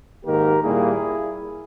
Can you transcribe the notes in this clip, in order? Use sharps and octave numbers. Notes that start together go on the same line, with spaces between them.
G#2 D#3 A#3 G4 A#4
A#2 G3 A#3 E4 G#4